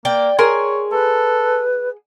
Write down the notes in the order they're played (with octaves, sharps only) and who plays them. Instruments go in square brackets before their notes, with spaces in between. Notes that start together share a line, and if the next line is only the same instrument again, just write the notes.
[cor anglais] A#3 [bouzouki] D5 G5
[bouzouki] G#4 [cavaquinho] A#4 G#5 C6 [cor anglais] C#5
[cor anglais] A4 [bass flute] B4